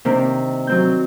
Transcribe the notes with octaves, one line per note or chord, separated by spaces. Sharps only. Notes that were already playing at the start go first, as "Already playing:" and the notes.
C3 D#3 A#3 C4 D4
F#3 C4 G6